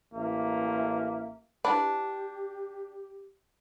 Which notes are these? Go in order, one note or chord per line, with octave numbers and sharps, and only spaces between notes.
A1 A#3 E5
D4 E4 G4 B4